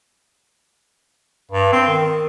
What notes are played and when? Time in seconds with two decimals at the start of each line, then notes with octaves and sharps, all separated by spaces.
1.52 G2
1.72 C4
1.87 D#3